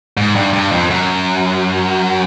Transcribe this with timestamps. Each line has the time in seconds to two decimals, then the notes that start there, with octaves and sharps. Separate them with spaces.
0.17 G#2
0.35 G2
0.53 G2
0.72 F2
0.90 F#2